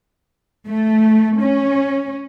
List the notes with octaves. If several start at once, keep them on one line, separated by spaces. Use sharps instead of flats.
A3
C#4